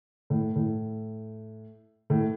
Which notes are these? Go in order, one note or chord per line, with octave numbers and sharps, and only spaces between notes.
A2
A2
A2